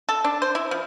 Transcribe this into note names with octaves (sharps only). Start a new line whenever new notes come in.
A4
D4
C5
E4
F3